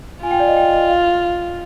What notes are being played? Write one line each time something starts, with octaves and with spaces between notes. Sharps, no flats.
F4 G#5
G5
D5
D#5
G5
D#5
F5